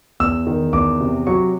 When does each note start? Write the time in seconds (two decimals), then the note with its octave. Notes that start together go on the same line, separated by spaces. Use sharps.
0.20 E2 E6
0.47 D#3
0.73 E2 D6
1.00 C3
1.27 F#3 C#6